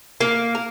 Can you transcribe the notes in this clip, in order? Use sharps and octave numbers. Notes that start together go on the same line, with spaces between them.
A#3
A#4